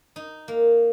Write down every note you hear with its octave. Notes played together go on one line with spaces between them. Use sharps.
D#4
A#3